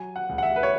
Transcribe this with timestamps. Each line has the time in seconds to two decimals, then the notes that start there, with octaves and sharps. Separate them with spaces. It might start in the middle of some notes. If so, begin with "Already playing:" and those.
Already playing: F#3 G#5
0.16 F#5
0.29 C#2
0.38 F#5
0.43 E5
0.56 B4
0.63 C#5